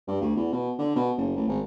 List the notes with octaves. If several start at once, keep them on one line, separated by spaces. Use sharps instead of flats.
G2
D2
E2
B2
D3
B2
F#1
A1
G#1